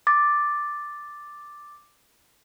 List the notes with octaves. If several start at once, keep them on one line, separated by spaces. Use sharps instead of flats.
D6 A6